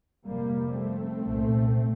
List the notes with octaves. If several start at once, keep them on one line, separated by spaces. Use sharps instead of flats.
F1 F2 C3 G3 A#3
A3 C4
C2 A#2